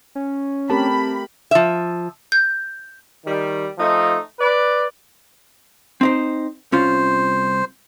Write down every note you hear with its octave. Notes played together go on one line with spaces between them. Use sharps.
C#4
A3 C4 G4 A#4 A5 B5
F3 E5
G6
D#3 G3
F3 A3 D#4
B4 D5
C4 D#4 C5
C2 C#4 F4 C5